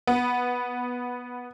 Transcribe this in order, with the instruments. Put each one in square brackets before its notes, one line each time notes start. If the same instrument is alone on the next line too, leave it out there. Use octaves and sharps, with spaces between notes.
[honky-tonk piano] B3